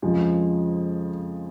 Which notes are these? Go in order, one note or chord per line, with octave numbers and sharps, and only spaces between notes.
F2 C#3 F3 G#3